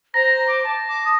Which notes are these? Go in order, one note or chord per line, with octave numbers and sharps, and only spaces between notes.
C5 A#5 A#6
D6
A5
D6
D#6